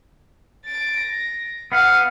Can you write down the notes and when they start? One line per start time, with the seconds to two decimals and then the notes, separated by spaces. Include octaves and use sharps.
0.65 A6 D7
0.99 A#6
1.72 B3 F5 F#5 F6 D#7